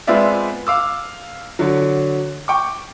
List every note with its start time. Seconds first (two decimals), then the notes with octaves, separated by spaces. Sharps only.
0.07 G#3 B3 C4 F4 D5 E5
0.67 F5 D6 E6
1.59 D3 F#3
2.48 G5 C#6 D6